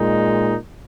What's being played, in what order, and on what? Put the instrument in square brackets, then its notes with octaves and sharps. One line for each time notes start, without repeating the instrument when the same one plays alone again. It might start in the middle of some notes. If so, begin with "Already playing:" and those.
Already playing: [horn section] A#2 G#3 D#4